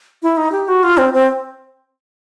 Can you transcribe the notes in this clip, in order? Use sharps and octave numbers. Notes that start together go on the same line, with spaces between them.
E4
D#4
G4
F#4
F4
C4
C4